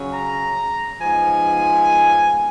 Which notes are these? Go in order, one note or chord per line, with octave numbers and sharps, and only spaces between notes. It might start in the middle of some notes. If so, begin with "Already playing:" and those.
Already playing: C#3 F#3 C#4
A#5
F3 G#3 B3 D#4 G#5